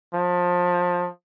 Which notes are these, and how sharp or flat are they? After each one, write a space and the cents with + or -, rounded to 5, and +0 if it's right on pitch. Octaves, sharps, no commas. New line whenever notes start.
F3 +25